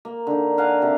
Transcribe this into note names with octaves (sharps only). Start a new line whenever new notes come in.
A#3
D3 D#4
A#4 F5 F#5 G#5
C3